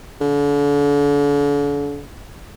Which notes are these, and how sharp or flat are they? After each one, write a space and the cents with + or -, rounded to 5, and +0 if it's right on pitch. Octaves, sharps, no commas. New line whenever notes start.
D3 -40